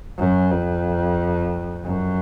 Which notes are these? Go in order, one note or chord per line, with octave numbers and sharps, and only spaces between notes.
F#2
F2
F#2